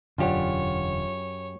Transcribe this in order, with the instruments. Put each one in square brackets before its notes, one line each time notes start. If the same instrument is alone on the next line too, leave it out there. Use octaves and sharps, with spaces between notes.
[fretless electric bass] E1 D3 [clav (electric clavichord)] F#2 G4 [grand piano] F4 D5 F#5 [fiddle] C#5